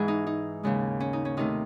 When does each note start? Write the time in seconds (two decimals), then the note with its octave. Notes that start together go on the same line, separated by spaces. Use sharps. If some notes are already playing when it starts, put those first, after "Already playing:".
Already playing: G#2 E3 G#3 G#4
0.08 D#4
0.27 D#4
0.63 D#2 C#3 G#3
1.00 C#4
1.13 D#4
1.25 C#4
1.37 C3 D#3 A3 D#4